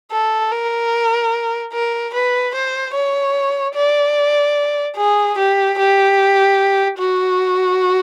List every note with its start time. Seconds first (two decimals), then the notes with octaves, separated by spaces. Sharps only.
0.12 A4
0.51 A#4
1.73 A#4
2.14 B4
2.55 C5
2.95 C#5
3.75 D5
4.97 G#4
5.38 G4
5.78 G4
6.99 F#4